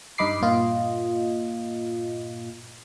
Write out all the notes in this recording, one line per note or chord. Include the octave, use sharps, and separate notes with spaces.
G2 D#4 D#5 B5 D6 C7
G2 A#2 A#3 F4 D#5